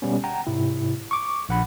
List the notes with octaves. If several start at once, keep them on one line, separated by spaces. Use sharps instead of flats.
B2 G3 B3 C#4
F#5 G5 A#5
G#2 C3 E4
C#6 D6
A#1 F#5 B5